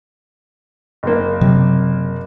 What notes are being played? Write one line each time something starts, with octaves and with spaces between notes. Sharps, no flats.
F#1 A#3
C3 F#3